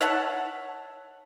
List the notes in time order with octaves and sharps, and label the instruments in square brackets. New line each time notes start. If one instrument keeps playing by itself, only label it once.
[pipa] C#5 E5 F#5 A5